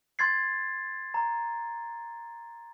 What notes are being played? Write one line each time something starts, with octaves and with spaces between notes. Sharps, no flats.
C6 G#6 A6 C7
A#5